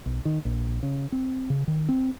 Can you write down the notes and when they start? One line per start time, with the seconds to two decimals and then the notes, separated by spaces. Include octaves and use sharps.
0.06 B1
0.25 D#3
0.45 A#1
0.83 C#3
1.12 C4
1.50 C#3
1.68 D#3
1.89 C4